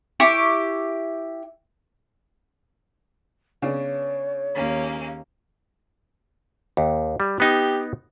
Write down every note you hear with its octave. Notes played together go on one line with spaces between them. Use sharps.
E4 G4 C#6
C#3 B3 D4 C#5
D#2 A#3 C#4
D#2
G3
B3 D#4 G4